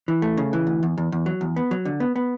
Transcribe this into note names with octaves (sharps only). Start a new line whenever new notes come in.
E3
A3
C#3
E3
D2
E2
E2
E2
F#3
E2
B3
F#3
D3
B3
B3